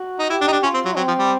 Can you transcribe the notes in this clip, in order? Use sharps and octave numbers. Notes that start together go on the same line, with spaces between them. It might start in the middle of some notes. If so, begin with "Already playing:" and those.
Already playing: F#4
D#4
E4 G4
D4
D#4
D4
C#4 F4
C4
F#3
F#3 C4
F3
G3